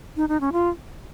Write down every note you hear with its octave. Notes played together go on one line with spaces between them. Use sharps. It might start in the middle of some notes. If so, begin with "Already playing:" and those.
D#4
D#4
C#4
F4